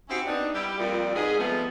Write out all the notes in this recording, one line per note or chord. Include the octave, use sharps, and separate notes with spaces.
C4 C#4 D#4 E4 F#4 G4
B3 C4 D4 D#4
G3 E4 G4
F2 A#2 G3
G#2 B2 G#4
C3 F3 G3 A3 B3